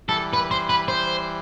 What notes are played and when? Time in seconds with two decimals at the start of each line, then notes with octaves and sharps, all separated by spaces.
0.08 E3 G3 A4
0.33 B4
0.51 C5
0.69 B4
0.88 C5